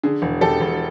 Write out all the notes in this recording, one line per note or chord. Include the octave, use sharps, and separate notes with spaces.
D3 G#4
E1
E1 G4 A4
E1